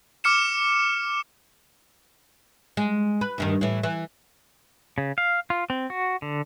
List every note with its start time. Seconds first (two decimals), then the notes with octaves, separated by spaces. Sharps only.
0.24 D6 F6 C#7 E7
2.77 G#3
3.21 B4
3.38 D2 G2 D#3
3.61 A2 E3
3.83 E3
4.98 C#3
5.18 F5
5.50 F4
5.70 C4
5.90 F#4
6.22 D3